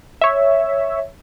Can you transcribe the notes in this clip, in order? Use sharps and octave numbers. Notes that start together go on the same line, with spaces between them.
C#5 E5